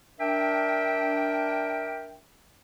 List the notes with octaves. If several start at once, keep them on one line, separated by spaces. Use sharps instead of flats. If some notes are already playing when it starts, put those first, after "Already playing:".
D4 A#4 E5 G5